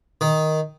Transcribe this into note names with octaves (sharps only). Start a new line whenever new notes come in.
D#3